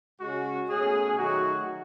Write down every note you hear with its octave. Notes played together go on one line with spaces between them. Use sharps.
C#3 G#3 C#4 F#4
B2 A3 C#4 G#4
D#3 F#3 A3 D#4 F#4